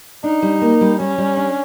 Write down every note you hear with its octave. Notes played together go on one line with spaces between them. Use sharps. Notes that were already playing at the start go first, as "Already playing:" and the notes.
D4 D#4
G3
A#3
G3
G3 C#4
G3
D4